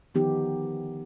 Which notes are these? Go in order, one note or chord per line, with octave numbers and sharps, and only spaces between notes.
D3 D#3 F3 B3 D#4 G4